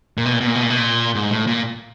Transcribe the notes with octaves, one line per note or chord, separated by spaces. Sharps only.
A#2
B2
A#2
B2
A#2
B2
A#2
B2
A#2
G#2
A2
A#2